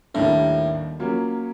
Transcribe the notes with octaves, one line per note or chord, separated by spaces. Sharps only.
D#2 A2 D#3 G3 A#3 D4
F#3 A#3 C#4 F4